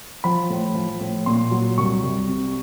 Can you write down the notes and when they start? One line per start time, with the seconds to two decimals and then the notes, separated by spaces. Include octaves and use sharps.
0.24 F3 B5
0.50 A2
0.75 F3
1.01 A2
1.26 A#2 C6
1.51 F#3
1.78 C2 C#6
2.03 C2
2.28 C3